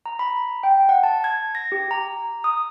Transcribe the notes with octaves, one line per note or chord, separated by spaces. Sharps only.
A#5
B5
G5
F#5
A5
G#6
A#6
G4
A#5
D#6